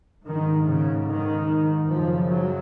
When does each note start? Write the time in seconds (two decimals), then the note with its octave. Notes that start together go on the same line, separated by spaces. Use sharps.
0.25 G#2 D#3
0.66 C#3
1.07 D#3
1.90 F#2 C#3 F3
2.31 F#3